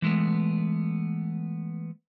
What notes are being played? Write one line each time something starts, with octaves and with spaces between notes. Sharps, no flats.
E3 G#3 A3 B3